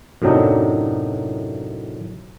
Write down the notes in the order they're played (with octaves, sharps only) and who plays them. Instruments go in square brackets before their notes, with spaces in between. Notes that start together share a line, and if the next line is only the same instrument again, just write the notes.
[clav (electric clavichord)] F#2 A2 C3 F#3 D4 D#4